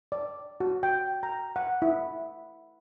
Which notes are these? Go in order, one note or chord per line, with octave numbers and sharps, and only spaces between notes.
D5
F#4
G5
A#5
F#5
E4